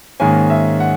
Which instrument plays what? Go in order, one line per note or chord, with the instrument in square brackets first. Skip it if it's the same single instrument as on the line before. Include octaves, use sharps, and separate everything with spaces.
[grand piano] G#2 D#3 A#3 C#4 G#5
E5
F#5